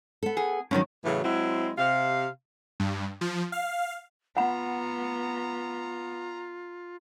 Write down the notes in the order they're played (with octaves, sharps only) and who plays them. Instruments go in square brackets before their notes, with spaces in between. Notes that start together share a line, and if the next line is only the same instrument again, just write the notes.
[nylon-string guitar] B3 A4
[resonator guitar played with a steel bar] G#4
[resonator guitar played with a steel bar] G2 D3 D#3 [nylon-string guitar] F#3 C#4
[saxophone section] A2 C#3 E3 F#3
F#3 G#3 C4 E4
C3 F5
[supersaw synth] G2
F3
F5
[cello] B3 [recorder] F4 [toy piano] F#5 B5 [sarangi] A#5